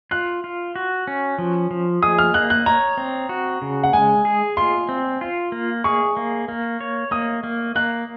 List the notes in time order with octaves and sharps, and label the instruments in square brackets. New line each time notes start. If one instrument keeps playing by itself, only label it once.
[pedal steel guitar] F4 [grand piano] F#6
[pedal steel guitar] F4
F#4
C#4
F3
F3
[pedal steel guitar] G#4 [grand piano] D#6
[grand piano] F6
[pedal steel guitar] A#3 [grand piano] F#6
[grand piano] F#6
[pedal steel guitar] C#5 [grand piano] A#5
[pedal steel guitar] C4
F#4
C#3
[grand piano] F#5
[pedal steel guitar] G#3 [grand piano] G#5
[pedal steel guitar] G#4
[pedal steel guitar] F4 [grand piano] C6
[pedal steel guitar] C4
F4
A#3
[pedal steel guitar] G#4 [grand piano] C#6
[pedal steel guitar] A#3
A#3
C#5
[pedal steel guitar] A#3 [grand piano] D#6
[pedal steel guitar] A#3
[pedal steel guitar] A#3 [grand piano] F#6